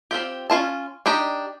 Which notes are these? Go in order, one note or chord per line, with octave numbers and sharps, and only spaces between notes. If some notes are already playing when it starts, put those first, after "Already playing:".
C4 F4 G4
C#4 E4 F4 A5
D4 D#4 G4 D#5